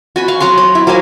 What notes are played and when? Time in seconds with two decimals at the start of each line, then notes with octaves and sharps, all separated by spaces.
0.16 F#4 G#5 B5
0.28 F5 C#6
0.40 F#3 F#5 A#5 C6
0.58 C#5
0.75 E4
0.87 F#3 A#3 C5 G#5